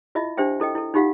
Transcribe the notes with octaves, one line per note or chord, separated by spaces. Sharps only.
E4 F4 D#5 E5
D4 G4 C5 E5 G5
E4 A4 D#5 G5
E4 A4
D#4 F4 G4 F5 F#5